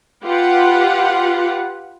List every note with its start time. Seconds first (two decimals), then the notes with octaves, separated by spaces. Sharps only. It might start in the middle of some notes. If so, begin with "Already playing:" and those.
0.24 F4 G4 B4 F#5